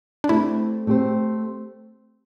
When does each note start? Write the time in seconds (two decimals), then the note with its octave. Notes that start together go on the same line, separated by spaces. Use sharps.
0.24 D4
0.29 A3 C4 E4 G4 C5
0.87 A3 C4 G4 C5